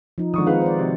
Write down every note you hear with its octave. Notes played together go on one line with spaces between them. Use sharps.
F3 D#4
D3 D#3 F3 G#3 C#6 D#6
C4 D#4 G#4 B4 F5 F#5
C5 D5
C3 F#4